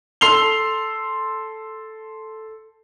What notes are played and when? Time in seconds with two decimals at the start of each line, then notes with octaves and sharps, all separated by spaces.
0.21 A4 C6 E6 C7 F7 G7